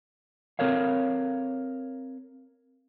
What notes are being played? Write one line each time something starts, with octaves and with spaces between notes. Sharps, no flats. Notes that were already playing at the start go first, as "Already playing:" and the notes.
C4 A4 A#4 C#5 F5